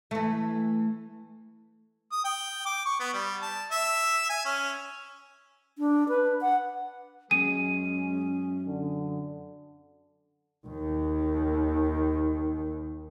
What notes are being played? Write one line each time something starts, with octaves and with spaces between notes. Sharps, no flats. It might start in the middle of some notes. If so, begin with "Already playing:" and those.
E3 A3
D#6
G5
D6
C#6
B3
G3
A5
E5
G#5
C#4
D4
B4
F#5
F#2 G#3 C#4 G#4 D#7
D3
D#2 D#3